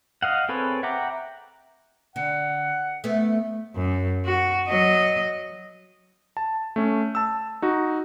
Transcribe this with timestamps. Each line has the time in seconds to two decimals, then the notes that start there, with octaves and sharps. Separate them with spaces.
0.22 D#5 F5 F#5
0.49 C4 G#4 A4 B4 C#5
0.83 E5 F#5 G5 A#5 D6
2.16 D3 F#5
3.04 A3 B3
3.76 F#2
4.26 F#4
4.69 F#3 D#5
6.37 A5
6.76 A3 C#4
7.15 A5 E6
7.62 D#4 F#4